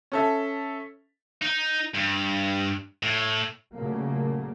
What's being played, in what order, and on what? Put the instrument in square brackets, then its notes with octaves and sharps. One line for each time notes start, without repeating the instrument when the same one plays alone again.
[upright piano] C#4 A4 E5
[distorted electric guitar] D#4
G2
A2
[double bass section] A#2 C#3 F#3 A3 A#3